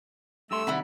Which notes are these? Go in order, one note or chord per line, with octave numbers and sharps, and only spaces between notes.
G2 A3 G4 C6 E6
C3 D#3 G3 E4 F#5 B5